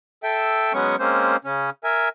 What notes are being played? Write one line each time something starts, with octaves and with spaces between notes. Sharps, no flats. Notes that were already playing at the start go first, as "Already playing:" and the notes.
A4 E5 G5
F#3 G#3 B3 C#4 C#6
G#3 A#3 C4 C#4 C5
C#3 C#4
A#4 E5 G#5